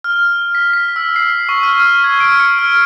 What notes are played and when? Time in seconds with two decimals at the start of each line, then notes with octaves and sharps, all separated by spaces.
0.04 F6
0.55 B6
0.73 B6
0.96 E6
1.16 C7
1.49 C#6
1.63 F6
1.80 F6
2.04 G#6
2.20 D7
2.40 C#7
2.59 F6